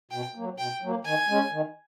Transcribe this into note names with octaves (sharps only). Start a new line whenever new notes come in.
B2 G5
F#3 A#3
B2 G5
F#3 A#3
D#3 G#5
G#3 C#4
D#3